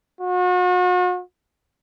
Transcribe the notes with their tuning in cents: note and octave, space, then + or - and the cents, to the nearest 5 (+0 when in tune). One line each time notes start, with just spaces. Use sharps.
F#4 -40